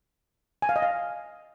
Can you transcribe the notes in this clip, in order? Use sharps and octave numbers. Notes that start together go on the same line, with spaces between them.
G#5
F5
D#5
F5